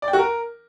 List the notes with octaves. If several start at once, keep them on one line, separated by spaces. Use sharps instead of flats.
D5
G5
F#4
A#4